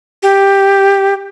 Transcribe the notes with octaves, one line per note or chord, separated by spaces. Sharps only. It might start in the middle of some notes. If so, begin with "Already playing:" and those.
G4